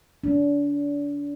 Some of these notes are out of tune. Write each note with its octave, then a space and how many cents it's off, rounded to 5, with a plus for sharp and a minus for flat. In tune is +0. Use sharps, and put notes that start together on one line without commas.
D4 -35